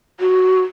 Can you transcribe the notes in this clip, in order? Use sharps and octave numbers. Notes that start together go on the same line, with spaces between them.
F#4